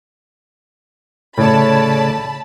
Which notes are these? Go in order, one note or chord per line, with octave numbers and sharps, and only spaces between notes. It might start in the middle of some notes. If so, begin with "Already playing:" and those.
A2 C#3 C#5 D5 A5 B5